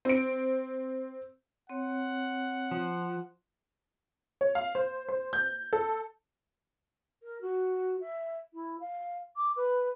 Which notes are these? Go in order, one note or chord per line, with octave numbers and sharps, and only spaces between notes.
C4 D7
C4 C#5 F#5
F3
C#5
F5
C5
C5
G6
A4
A#4
F#4
E5
E4
F5
D6
B4